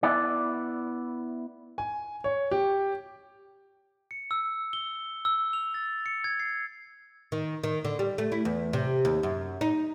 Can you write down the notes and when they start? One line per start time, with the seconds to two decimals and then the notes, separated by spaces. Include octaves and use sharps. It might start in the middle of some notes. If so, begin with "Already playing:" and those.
0.03 B3 E4 D5
1.78 G#5
2.24 C#5
2.51 G4
4.11 C#7
4.31 E6
4.73 G7
5.25 E6
5.53 F7
5.74 A6
6.06 C#7
6.24 G#6
6.40 C7
7.32 D#3
7.63 D#3
7.85 D3
7.99 G3
8.18 A3
8.32 E4
8.45 E2
8.73 C3
9.05 D#2
9.23 F#2
9.61 D#4